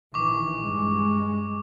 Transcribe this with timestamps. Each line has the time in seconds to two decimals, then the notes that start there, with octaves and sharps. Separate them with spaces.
0.14 A#1 D#3 E3 C#6 D6
0.61 G2 G#3